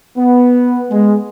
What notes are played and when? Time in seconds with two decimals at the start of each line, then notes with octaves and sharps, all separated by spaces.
0.17 B3
0.91 G#3